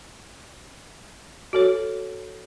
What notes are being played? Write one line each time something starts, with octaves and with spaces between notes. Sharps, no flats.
F#4 A4 C#5